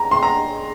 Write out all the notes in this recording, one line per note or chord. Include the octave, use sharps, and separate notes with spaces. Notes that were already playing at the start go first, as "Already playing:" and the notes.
Already playing: A#5
C6
A#5